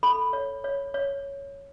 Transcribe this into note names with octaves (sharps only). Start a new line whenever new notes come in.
A4 B5
C#5
C#5
C#5